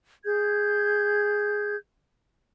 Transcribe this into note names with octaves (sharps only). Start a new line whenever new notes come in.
G#4 G6 G#6